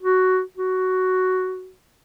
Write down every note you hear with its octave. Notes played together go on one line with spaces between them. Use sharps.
F#4
F#4